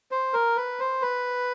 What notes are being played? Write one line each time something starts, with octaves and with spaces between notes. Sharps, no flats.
C5
A#4
B4
C5
B4